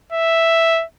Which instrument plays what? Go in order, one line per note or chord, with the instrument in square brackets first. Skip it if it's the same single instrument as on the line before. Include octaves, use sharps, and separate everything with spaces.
[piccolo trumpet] E5